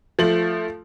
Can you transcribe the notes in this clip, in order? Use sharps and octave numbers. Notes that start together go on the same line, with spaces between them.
F3 A3 F#7